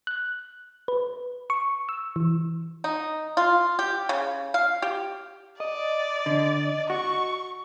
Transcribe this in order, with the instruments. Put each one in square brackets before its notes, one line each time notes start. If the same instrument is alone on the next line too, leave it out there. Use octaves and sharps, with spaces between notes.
[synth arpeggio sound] F#6
B4
C#6
E6
E3
[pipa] D#4
F4
G4
C#3
F5
G4
[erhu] D5 [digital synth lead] D#5
[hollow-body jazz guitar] D3
[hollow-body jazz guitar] F#4 [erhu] C#6